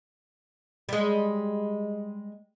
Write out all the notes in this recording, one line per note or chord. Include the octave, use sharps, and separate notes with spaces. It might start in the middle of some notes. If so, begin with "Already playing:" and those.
G3 G#3